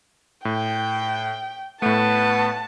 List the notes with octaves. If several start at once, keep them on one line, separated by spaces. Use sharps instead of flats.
A2 G5
A2 A3 B3 A5